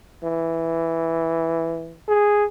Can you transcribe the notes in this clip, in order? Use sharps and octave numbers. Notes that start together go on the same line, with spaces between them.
E3
G#4